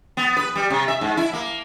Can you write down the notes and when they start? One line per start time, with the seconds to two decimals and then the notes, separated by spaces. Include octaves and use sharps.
0.17 B3
0.37 B4
0.55 G3
0.70 C3
0.88 E5
1.01 G#2
1.17 E4
1.33 A#3